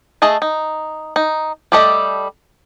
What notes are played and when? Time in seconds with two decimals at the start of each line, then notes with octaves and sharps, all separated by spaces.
0.22 A3 G#4 D#5 A5
0.42 D#4
1.16 D#4
1.72 G3 A3 G4 A4 D#5